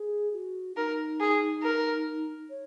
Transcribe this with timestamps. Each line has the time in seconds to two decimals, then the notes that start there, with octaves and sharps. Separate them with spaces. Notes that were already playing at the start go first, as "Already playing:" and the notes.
Already playing: G#4
0.33 F#4
0.76 D#4 A#4
1.20 G#4
1.63 A#4
2.50 C#5